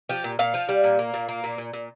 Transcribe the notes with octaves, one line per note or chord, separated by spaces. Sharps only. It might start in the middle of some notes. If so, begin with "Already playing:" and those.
F3 G4
A#2
A#2 F5
F3
G3
A#2
A#3
A#2
A#3
A#2
A#2
A#2